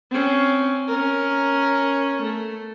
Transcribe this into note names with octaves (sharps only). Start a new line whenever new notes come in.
C4 C#4
C#4 A#4
A3